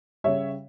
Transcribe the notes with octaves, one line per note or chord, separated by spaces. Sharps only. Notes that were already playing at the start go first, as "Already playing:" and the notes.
C#3 G3 C#5 E5